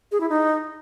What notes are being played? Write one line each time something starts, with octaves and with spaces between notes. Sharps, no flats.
G#4
E4
D#4